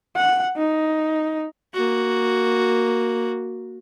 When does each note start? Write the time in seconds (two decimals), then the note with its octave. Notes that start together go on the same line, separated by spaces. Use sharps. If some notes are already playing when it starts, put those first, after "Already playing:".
0.16 F#5
0.56 D#4
1.74 A#3 F#4